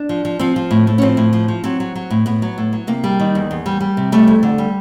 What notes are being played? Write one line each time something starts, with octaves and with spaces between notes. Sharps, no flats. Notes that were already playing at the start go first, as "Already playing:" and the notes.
Already playing: D4
F3
F3
F3 C4
F3
A2
A2
C#4
F3 C4
A2
F3
F3
F#3 C4
F#3
F#3
A2
A2 B3
F#3
A2
F#3
C3 A#3
G3
D#3
E2
E2
G3
G3
C3
G3 A3
F2
D3
G3